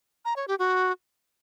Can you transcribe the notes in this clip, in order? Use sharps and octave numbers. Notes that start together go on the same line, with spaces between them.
A#5
C#5
G4
F#4